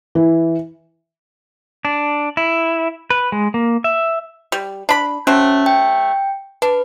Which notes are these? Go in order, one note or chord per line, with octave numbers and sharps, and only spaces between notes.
E3
D4
E4
B4
G#3
A#3
E5
G3
D4 B5
F#3 A3 C4 C#4
G5
D4 B4